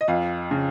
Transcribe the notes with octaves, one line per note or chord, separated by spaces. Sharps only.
D#5
F2 F5
C#3